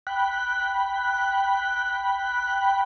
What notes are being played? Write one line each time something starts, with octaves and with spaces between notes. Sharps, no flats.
G5 B5 F#6